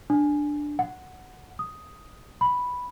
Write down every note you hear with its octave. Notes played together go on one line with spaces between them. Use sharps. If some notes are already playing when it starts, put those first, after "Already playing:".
D4
F#5
D#6
B5